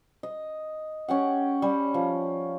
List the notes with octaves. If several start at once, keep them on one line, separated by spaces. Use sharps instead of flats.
D#5
C#4 G4 F#5
G3
F3